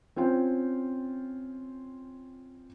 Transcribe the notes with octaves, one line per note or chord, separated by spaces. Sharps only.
C4 C#4 F4 G5